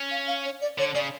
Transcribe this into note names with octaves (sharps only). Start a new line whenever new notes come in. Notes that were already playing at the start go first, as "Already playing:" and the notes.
Already playing: C#4
F5
F5
C#5
D5
D3 C#5
C#3 D5